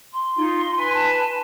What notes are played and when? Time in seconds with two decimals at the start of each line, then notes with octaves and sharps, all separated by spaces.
0.13 C6
0.37 D#4 F4
0.75 B4 G#5
0.94 A5